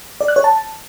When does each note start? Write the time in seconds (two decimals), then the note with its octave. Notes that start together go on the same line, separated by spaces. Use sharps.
0.21 D5
0.28 F#6
0.36 C#5
0.44 A5